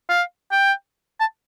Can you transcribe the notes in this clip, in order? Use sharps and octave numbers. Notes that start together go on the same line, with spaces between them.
F5
G5
A5